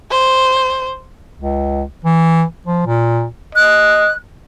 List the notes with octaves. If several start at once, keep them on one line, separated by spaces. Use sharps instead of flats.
C5
C#2
E3
F3
A#2
D#5 F#6